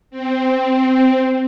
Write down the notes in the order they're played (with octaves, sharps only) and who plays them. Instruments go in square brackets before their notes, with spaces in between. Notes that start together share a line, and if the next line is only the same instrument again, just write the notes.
[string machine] C4